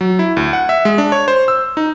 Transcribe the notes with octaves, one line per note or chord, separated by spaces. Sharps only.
F#3
E4
D2
F#5
E5
G#3
D4
C#5
C5
E6
D#4